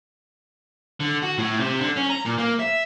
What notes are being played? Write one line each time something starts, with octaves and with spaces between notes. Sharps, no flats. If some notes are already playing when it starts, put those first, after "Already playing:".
D3
F#4
A2
C3
D3
C#4
A#5
A#2
A#3
E5